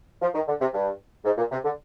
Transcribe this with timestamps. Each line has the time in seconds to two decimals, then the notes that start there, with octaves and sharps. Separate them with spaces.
0.22 F3
0.34 D#3
0.48 D3
0.61 C3
0.74 G2
1.25 G#2
1.38 A#2
1.52 C3
1.64 D3